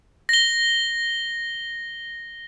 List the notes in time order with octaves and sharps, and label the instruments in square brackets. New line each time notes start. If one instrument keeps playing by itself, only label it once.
[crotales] A#6 G7